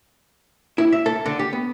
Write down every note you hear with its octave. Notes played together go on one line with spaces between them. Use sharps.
E4
E5
A4
D3
G4
B3